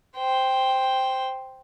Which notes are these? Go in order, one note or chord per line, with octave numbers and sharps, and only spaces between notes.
C5 G5